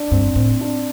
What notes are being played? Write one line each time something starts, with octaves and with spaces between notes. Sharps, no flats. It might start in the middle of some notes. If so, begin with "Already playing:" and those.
Already playing: D4
G2 C4
A2 C4
D4